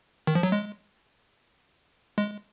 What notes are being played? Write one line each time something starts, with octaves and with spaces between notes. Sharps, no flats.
D#3
F3
F#3
G#3
G#3